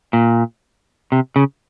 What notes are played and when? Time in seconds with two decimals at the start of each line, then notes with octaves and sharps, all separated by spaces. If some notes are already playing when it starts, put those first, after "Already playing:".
0.13 A#2
1.12 C3
1.36 C#3